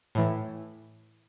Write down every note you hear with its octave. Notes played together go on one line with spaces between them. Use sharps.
A2 E3